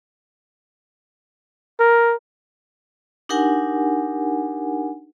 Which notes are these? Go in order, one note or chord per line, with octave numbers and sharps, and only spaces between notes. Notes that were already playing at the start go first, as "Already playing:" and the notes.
A#4
D4 D#4 G4 A#4 F#5 G#5